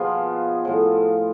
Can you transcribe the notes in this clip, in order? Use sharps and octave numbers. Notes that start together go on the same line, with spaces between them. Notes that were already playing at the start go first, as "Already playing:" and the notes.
Already playing: B2 F3 B3 F4 G#4
A2 F3